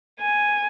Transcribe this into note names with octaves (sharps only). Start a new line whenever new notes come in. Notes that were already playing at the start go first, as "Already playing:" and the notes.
G#5